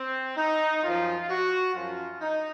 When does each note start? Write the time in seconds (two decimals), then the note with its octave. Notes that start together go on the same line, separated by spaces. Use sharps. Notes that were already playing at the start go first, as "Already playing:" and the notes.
Already playing: C4
0.37 D#4
0.83 F#2 F3 F4
1.29 F#4
1.75 F#2 F3 F4
2.21 D#4